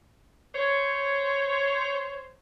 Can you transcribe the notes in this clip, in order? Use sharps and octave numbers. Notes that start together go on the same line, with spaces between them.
C5 C#5